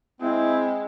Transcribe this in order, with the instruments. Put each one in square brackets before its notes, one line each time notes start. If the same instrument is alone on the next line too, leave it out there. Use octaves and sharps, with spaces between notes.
[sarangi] G#3 [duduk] C4 [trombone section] E4